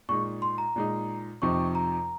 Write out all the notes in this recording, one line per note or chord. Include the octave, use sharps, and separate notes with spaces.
A#2 G#3 D#4 C#6
C6
A#5
A#2 G#3 D#4
F2 C3 F3 C4 D#4 C#6
A#5